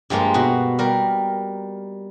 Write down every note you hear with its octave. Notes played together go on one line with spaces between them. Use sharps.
G2 F3 G#3 A#3 F4
B2 F#4
G3 A#4